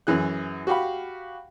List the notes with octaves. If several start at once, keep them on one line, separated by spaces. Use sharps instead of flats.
F#2 E3 G#4 F#6
F#4 G4 F5 F#5 B5